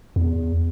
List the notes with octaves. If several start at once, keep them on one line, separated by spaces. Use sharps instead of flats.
E2